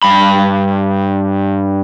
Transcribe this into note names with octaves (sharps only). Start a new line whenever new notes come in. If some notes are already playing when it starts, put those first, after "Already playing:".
G2 B5